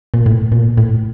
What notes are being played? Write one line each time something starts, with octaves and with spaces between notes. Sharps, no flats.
A#2
A2
A#2
A2